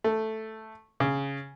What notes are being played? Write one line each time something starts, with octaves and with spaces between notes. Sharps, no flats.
A3
C#3